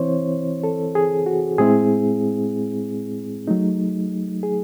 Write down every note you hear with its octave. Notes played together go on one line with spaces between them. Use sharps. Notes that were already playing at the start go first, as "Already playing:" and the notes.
Already playing: E3 C4 E4 C5 C#5
A4
G#4
F#4
A2 G#3 C4 E4 G#4
F#3 A3 D#4
G#4